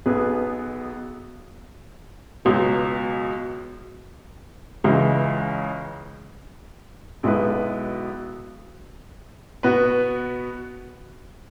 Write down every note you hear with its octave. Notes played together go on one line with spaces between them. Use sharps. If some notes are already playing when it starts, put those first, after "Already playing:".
B1 B2 B3 G#4 B4
C#2 B2 F#3
C#2 C#3 E3 G#3
B1 B2 G#3 E4 B4
B2 B3 F#4 B4